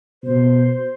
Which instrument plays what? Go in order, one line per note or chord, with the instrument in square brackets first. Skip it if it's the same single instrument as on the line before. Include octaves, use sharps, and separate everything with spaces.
[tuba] B2 [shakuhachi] C5